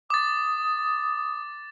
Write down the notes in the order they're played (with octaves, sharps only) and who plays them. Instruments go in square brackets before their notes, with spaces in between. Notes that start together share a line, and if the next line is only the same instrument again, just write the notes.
[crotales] D6 A6 [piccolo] D#6